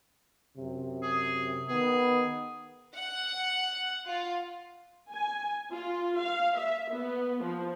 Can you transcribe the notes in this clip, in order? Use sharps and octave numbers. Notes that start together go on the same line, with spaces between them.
F#2 C3
G#4
D#3 B3 G#4
F#5
F4
G#5
F4
F5
E5
B3
F3